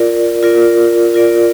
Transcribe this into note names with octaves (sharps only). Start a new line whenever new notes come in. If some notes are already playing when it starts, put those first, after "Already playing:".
Already playing: F4 A#4 D5
F4 A#4 D5
F4 A#4 D5